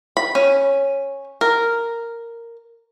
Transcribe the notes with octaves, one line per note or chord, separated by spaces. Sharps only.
B5
C#4
A#4